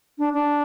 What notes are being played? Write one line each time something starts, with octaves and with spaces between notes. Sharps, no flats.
D4
D4